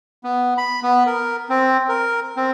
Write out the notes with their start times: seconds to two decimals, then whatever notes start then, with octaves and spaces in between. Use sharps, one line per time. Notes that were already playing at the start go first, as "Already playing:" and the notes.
0.24 B3
0.58 B5
0.83 B3
1.07 A#4
1.50 C4
1.89 A#4
2.36 C4